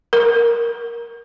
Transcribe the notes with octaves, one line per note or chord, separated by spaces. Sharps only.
A#4